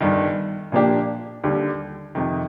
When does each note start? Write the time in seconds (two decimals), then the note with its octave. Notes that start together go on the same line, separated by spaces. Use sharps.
0.01 G1 G2 D#3
0.72 A#2 F3 A#3 D4 G4
1.44 D#2 D3 G3
2.15 F2 C3 D#3